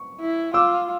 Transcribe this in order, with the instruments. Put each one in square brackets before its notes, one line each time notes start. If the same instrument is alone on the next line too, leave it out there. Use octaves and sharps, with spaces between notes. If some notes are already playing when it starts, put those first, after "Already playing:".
Already playing: [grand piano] C#6
[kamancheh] E4
[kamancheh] F4 [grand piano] D6 E6